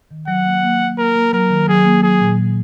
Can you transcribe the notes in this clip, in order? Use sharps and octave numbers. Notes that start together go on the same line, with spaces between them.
D#3
F#3 F#5
A#3
A#3
F#3
A#3 A#4
A#3
F#3 A#4
D#3
F#3 G#4
A#3
F#3 G#4
A#2
F#3